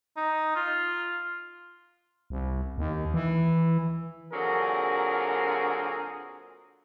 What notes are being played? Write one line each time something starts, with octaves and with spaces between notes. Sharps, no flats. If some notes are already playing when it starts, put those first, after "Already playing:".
D#4
F4
C2
D#2
E3
A#2 D3 F#3 C4 G#4 A#4